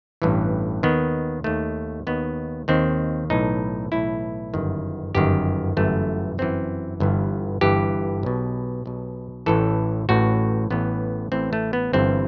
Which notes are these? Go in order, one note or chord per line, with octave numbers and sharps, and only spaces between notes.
A1 G2 E3
D#2 D#3 B3
D#2 D#3 A3
D#2 D#3 B3
D#2 D#3 C4
B1 A2 E3 D#4
B1 A2 E3 E4
G1 F#2 D#3
G1 F#2 D#3 G4
G1 F#2 E3 A3
G1 F#2 E3 C4
G1 G2 E3
G1 G2 E3 G4
B1 B2
B1 B2
A1 A2 E3 A4
A1 A2 E3 F#4
A1 A2 E3 B3
A1 A2 E3 C4
A3
B3
G1 G2 E3 C4